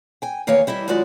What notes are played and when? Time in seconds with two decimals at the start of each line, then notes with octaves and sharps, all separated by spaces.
0.22 G5 G#5
0.47 E2 D#3 A#3 C#5 F5 G#5
0.67 G3 E4 D#5 E5
0.88 F#2 D#3 G#3 F4 F#4 D5